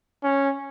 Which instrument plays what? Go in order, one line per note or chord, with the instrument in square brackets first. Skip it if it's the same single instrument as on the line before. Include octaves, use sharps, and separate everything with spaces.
[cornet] C#4